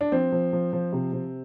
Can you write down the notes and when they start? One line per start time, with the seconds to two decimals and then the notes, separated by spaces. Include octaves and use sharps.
0.01 D4
0.12 F3 C4
0.32 F3
0.53 F3
0.73 F3
0.93 C3
1.13 C3